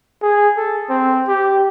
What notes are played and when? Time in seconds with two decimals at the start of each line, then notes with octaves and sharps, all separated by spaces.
0.22 G#4
0.57 A4
0.89 C4
1.28 G4